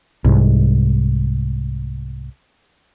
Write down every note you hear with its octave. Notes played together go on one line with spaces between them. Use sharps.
C2 G#2